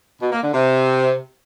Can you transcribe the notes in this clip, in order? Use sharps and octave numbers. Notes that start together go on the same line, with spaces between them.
B2
A#3
D3
C3